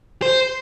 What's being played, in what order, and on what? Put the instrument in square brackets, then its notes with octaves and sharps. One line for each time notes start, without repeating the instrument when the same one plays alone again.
[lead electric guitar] C5